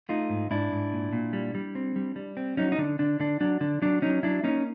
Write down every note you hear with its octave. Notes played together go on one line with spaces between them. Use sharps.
A3 D#4 F4
G#2
G#2 D4 E4
G#2
A#2
A#2
G3
G3
C4
G3
G3
C4
F#3 C#4 D#4
D#4
D3 D4
D3 D4
D3 D4
F#3 D4
D3 D4
F#3 D4
F#3 C#4 D#4
F#3 D4 E4
A#3 C#4 D#4